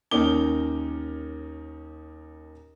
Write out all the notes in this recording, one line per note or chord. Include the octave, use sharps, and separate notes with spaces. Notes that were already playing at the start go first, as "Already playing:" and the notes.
D#2 C#4 D#4 A#4 D6 G7